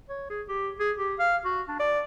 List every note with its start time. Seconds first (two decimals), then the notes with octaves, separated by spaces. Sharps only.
0.09 C#5
0.30 G#4
0.49 G4
0.80 G#4
0.98 G4
1.19 F5
1.45 F#4
1.69 D4
1.80 D5